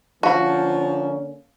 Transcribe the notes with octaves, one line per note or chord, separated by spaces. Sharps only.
D3 F3 A#3 C#4 F#4 F5 A5